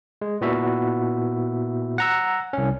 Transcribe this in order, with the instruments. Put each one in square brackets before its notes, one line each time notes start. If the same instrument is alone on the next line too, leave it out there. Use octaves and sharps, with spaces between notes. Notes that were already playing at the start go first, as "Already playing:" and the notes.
[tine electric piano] G#3
A#2 B3 E4 F#4 E5
F#5 A#5 E6
C2 C#4